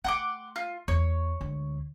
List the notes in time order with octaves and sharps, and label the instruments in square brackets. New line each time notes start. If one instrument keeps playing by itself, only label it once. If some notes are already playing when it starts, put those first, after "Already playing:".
[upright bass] A3 [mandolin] F#5 C6 D6
[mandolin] F4
[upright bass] E2 [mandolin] C#5
[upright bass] D2 G#3